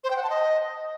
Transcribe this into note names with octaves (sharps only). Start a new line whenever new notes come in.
C5
G5
F#5
A5
D#5